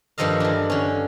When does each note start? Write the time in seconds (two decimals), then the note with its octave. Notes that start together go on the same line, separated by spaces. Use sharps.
0.18 G2 D#3 F3 A4 D#5 F5
0.40 E3 D4
0.70 D3 C#4